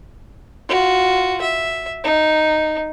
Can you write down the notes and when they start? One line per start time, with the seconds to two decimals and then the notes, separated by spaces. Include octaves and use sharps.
0.69 F4 F#4
1.41 E5
2.04 D#4